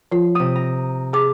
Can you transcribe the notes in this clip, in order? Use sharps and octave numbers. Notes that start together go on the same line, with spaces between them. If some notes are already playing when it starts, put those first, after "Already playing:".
F3 F4
C3 D#6
A#5
G#4 A5 D6